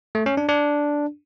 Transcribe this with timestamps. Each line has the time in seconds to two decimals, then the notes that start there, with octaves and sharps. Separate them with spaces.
0.15 A3
0.26 C#4
0.37 D4
0.49 D4